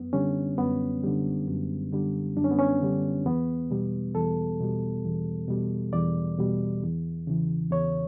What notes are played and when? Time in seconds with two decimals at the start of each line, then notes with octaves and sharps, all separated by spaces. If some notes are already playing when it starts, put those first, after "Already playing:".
Already playing: F#2 B3
0.13 D3 G3 C#4
0.58 F#2 B3
1.03 D3 G3
1.48 F#2
1.92 D3 G3
2.37 F#2 D4
2.44 C#4
2.51 B3
2.59 C#4
2.81 D3 G3
3.26 E2 B3
3.71 B2 G3
4.15 E2 A4
4.60 B2 G3
5.05 E2
5.48 B2 G3
5.93 E2 D5
6.38 B2 G3
6.83 E2
7.27 C#3 E3
7.71 E2 C#5